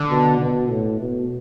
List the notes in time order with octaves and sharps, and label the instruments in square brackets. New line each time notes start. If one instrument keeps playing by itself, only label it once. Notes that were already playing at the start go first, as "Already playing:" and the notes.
Already playing: [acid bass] D3
[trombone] B2
B2
A2
B2